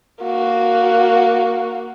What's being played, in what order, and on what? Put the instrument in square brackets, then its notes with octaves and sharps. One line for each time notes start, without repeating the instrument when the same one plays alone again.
[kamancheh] A#3 F#4